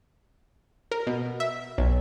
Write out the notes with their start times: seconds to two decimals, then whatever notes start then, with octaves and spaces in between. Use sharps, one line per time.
0.91 A#4
1.07 B2
1.40 E5
1.78 B1